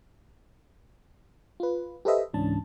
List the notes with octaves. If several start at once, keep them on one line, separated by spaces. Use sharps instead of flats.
F4 B4
G4 A4 B4 C5 D#5 E5
C#2 G#2 E3 C#4 D4 A5